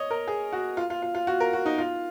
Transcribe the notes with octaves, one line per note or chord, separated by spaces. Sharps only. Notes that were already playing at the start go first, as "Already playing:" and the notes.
Already playing: C#5 D#5
A#4
G#4
F#4
F4
F4
F4
F4
F#4
A#4
F#4
D#4
F4